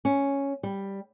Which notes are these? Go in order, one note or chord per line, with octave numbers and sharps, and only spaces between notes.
C#4
G3